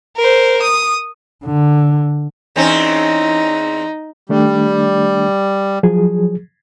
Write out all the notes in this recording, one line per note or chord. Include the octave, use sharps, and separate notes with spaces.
A#4 C5
D#6
D3
E2 C4 C#4 D#4
D#3 G3 A3 D4
F3 F#3 G#4